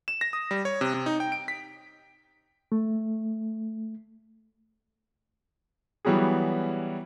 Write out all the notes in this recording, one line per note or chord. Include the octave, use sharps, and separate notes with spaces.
E7
A#6
D#6
G3
C#5
C3
C3
D#4
G5
D7
B6
A3
E3 F#3 G3 B3 F#4 G#4